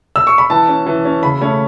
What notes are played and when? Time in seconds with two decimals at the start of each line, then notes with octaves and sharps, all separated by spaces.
0.16 E6
0.27 C#6
0.38 B5
0.50 E3 A5
0.68 C#4
0.86 E3
1.05 C#4
1.23 C#3 B5
1.41 A3 C#4